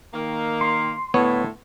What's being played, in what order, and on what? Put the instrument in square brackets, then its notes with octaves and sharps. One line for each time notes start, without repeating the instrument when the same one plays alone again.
[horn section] D#3 A#3
[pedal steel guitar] C6
[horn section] A2 D3 A3 [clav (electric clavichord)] B3 C#5